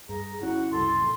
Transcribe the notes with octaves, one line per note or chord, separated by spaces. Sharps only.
G2 G#4 A#5
G1 C#4 E4 F#4
F#1 C2 F#2 A4 C6
A#1